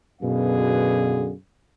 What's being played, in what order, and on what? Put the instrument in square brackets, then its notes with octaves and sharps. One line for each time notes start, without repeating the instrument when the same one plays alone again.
[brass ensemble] F#2 B2 D3 B3 G#4 F5